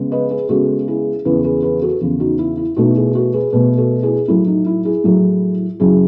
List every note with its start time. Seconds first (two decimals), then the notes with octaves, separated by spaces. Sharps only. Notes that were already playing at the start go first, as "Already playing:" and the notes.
Already playing: C#3 G#3 B3
0.11 B4 D#5
0.30 G#4 B4
0.49 C#3 G#3 B3 F#4 A4
0.88 E4 G#4
1.25 E2 C#3 E3 G#4 B4
1.44 G#4 B4
1.63 G#4 B4
1.82 F#4 A4
2.01 E2 C#3 E3
2.20 D#4 F#4
2.39 E4
2.57 E4
2.76 B2 A3 D#4 F#4
2.96 E4 G#4
3.15 F#4 A4
3.33 G#4 B4
3.52 B2 A3 G#4 B4
3.77 F#4 A4
4.03 E4 G#4
4.28 A2 F#3 A3 E4
4.47 D#4
4.66 E4
4.85 E4 G#4
5.04 A2 F#3 A3
5.80 F#2 C#3 F#3 E4 G#4